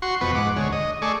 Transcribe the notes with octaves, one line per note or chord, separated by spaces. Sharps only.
F#4 C6 C#6
F2 B2 B4 C#6
G#2 F#5 D6
D2 G#3 C#5
D#5
A3 G#4 D5 C#6